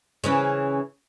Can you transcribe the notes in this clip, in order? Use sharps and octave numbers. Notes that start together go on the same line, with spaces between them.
C#3 E3 C#4